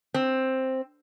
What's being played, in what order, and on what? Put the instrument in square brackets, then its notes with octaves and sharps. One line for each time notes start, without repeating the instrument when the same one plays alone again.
[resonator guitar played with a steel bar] C4